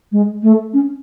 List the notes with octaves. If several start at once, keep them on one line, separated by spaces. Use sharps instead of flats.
G#3
A3
C#4